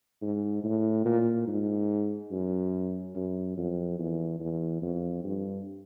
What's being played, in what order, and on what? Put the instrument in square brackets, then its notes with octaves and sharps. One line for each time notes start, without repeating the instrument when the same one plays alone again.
[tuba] G#2
A2
A#2
G#2
F#2
F#2
F2
E2
E2
F2
G2